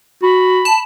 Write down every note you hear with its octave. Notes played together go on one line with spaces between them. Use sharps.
F#4 B5
A5